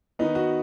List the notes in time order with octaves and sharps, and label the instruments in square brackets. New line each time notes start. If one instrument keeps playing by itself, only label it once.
[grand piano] D#3 B3 D#4
F#4